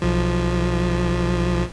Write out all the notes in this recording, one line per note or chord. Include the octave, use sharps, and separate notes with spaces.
B1 F3